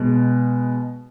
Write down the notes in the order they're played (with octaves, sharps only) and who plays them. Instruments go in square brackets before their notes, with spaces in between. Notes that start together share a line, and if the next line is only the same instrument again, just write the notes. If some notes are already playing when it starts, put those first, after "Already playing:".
Already playing: [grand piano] B2 G#3